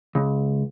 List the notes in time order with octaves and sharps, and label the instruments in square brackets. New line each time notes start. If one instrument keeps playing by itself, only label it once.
[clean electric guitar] C#2